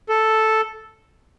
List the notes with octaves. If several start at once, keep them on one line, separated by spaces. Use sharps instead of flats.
A4